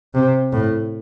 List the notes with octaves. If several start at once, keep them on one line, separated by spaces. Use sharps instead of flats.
C3
A2